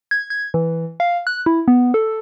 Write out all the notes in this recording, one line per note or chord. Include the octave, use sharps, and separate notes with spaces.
G#6
G#6
E3
F5
F#6
E4
B3
A4